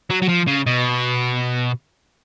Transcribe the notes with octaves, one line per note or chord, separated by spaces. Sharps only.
F#3
F#3
F3
C#3
B2